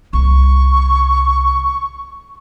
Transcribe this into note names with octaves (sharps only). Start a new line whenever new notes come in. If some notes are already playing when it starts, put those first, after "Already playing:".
C2 C#6